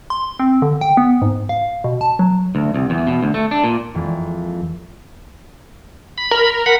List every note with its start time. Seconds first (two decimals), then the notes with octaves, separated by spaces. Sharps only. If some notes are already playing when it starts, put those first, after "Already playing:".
0.10 C6
0.39 C4
0.62 D3
0.81 G5
0.97 B3
1.22 G#2
1.49 F5
1.84 B2
2.01 A5
2.19 F#3
2.55 D2
2.74 C2
2.90 E2
3.07 B2
3.23 D2
3.34 A3
3.51 D4
3.64 A#2
3.95 F2 E3 G#3 A#3
6.18 B5
6.31 A#4
6.66 F#5 B5